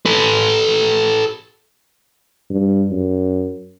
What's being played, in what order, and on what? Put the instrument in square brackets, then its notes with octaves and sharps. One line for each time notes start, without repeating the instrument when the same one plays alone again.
[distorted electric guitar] A4 B4
[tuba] G2
F#2